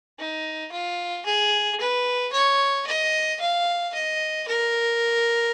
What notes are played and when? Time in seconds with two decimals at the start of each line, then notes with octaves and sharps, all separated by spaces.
0.19 D#4
0.72 F4
1.26 G#4
1.80 B4
2.32 C#5
2.87 D#5
3.40 F5
3.94 D#5
4.48 A#4